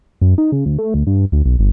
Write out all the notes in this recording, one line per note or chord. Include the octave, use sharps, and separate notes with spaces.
F#2
D#4
C#3
D2
A3
D2
G2
D2
B1
G1